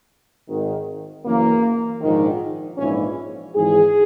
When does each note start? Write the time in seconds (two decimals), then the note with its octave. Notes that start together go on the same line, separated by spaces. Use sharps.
0.48 G#1 G#2 D#3
1.25 F#1 F#2 E3 A#3
2.01 A#1 G#2 D#3
2.78 A#1 G#2 E3 C#4
3.54 G#1 G#2 E3 G#4